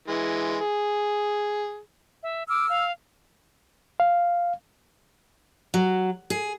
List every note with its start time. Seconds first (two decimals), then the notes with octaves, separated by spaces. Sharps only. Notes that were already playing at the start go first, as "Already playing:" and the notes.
0.08 E3 G#3
0.61 G#4
2.23 E5
2.49 D6 E6 F6
2.69 F5
4.00 F5
5.74 F#3
6.30 G#4